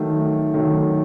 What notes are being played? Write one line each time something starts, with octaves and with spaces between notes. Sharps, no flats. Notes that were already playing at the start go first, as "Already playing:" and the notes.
Already playing: D#3 F#3 A3
D#3 F#3 A3